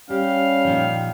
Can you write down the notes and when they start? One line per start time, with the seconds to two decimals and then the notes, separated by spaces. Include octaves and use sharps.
0.10 G3 C#4 G4 F5
0.65 A#2 D#3 F3